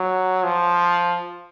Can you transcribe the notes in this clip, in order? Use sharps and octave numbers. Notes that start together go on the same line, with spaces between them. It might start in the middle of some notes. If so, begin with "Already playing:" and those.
Already playing: F#3
F3